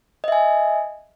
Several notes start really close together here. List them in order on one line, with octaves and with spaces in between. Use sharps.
D#5 E5 G#5